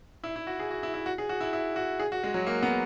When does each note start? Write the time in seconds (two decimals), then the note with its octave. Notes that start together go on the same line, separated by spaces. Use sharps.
0.24 E4
0.36 E4
0.47 F#4
0.60 G#4
0.70 F#4
0.83 E4
0.94 E4
1.06 F#4
1.18 G#4
1.29 F#4
1.41 E4
1.53 E4
1.76 F#4
2.00 G#4
2.12 F#4
2.24 G#3
2.34 F#3
2.47 A#3
2.63 B3